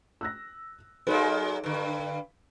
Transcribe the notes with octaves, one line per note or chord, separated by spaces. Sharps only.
E6 F#6 A#6
F#3 G#3 A#3 D#4 A4 C5
G2 D3